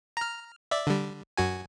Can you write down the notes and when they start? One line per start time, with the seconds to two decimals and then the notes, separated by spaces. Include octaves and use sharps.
0.17 A#5 F6
0.71 D5 E5
0.87 D3 G3
1.37 F#2 F#4 G#5